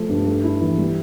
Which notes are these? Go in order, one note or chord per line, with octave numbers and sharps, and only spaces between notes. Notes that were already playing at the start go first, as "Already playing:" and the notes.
Already playing: F3 A3
G2
A3
E4
E3
G3